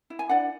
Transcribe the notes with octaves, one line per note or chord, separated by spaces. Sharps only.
E4
G#5
D4 D5 F#5